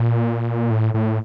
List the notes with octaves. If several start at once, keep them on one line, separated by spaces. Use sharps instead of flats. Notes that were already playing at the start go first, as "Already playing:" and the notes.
Already playing: A#2
A2
A2